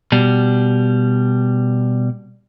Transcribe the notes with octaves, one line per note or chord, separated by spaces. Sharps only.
B2 G3